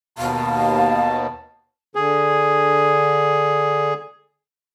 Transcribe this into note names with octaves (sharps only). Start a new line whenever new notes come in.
D#2 B2 F5 A5
D3 G#4